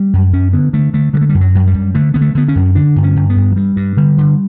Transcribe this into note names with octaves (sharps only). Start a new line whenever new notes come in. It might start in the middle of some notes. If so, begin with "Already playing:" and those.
Already playing: G3
F#2
F#2 C#4
D3 B3
D3 A3
D3 A3
D3 G3
A3
G3
F#2
F#3
F#2
G3
F#2
D3 A3
D3 B3
A3
D3 B3
C#4
F#2
D3 D4
G2
C#4
G2
B3
G2
F#3
G2 G3
G2
D3 G3
D3